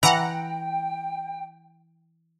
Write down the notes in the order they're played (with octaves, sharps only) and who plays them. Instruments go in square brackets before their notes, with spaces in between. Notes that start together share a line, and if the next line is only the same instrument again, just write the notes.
[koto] E3 [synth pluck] F#5 A#5 [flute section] G5